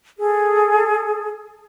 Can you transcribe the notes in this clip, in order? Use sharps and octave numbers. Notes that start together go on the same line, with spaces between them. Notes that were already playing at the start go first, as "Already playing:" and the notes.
G#4 A4